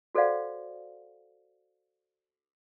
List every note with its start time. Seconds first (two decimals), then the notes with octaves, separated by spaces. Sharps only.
0.15 F#4 A4 C5 D5 F5 F#5